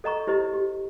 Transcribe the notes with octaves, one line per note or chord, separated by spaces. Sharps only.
A4 D#5 A#5 C#6
E4 G4 C5 D#5
G4